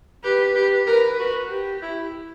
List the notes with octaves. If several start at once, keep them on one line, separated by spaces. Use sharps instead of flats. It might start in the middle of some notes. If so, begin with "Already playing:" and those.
G4 B4
G4
A#4 B4
F#4
G4
E4